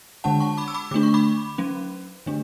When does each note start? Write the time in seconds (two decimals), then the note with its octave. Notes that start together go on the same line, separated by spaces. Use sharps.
0.24 D3 G#3 D4 F#5 A5
0.40 A5 C#6
0.57 B5 D6
0.68 E6
0.74 B5 D6
0.91 D3 A3 D4 D6
1.03 C#6
1.14 B5 D6
1.58 F#3 C#4
2.26 D3 A3 D4